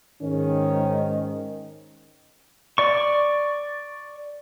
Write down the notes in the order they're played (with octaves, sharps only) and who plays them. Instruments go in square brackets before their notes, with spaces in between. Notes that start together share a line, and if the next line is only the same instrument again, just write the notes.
[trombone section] G#2 D#3 [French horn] C#4
[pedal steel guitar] D5 C#6